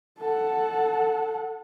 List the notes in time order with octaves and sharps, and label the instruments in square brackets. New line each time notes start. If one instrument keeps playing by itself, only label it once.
[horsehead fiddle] A4 F#5